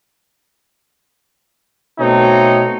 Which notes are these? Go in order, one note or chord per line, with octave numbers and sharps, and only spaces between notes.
B2 A3 C4 D#4 C#5